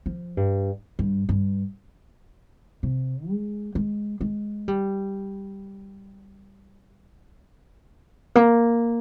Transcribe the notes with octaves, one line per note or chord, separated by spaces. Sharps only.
F3
G2
G2
G2
C3
G#3
G#3
G#3
G3
A#3